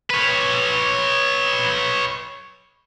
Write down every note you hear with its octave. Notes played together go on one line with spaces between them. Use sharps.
B4 C#5